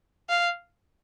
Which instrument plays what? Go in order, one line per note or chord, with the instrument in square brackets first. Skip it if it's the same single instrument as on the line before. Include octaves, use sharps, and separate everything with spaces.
[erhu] F5